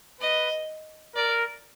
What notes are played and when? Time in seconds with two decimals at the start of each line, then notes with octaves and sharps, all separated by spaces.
0.21 B4 D#5
1.16 A#4 D5